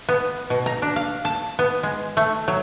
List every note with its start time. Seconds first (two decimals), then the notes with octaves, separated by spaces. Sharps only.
0.09 B3
0.50 B2
0.66 A#5
0.82 D4
0.96 F5
1.25 A5
1.59 B3
1.83 G#3
2.17 A3
2.48 F#3